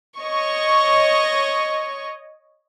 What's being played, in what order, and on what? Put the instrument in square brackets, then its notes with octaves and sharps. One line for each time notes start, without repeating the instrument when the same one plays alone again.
[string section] C#5 D#5 C#6